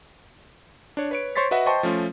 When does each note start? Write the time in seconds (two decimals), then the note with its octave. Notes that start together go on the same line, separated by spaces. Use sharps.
0.97 D4 C#5
1.11 B4 C#5 D7
1.36 C5 C#5 C6 C#6 A6 B6
1.51 F#4 B4 D#5 E5 F#5
1.66 C5 D#5 G5 A5 C6 C#6
1.83 F3 A3 C#4 F4